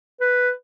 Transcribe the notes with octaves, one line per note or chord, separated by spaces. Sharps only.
B4